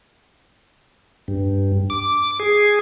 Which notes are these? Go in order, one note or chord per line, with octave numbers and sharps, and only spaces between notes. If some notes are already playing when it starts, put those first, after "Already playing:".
G2
D6
G#4